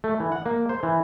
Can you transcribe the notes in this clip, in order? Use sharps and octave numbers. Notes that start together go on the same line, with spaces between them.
A3
E3
F#5
A#3
C5
E3